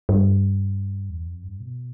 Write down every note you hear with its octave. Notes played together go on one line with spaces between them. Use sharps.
G2
E2
F2
G2
B2